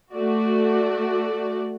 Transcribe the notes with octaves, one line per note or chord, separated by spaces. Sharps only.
A3 F#4 D5